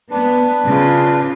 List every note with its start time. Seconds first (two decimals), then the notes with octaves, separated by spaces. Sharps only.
0.11 B3 D4 B4
0.65 C#3 F4